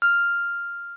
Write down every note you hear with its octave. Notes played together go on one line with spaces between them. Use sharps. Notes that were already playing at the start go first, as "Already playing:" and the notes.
F6